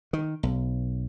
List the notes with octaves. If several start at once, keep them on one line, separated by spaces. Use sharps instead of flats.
D#3
B1